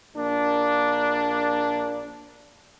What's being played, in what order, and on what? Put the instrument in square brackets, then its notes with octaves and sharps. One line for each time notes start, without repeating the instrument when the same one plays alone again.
[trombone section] A#1 A#3 D4